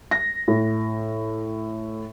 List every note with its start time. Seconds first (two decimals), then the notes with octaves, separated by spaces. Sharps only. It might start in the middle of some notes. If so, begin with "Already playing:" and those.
0.11 A#6
0.48 A2